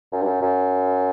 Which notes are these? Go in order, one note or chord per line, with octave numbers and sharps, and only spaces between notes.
F#2
G2
F#2
F#2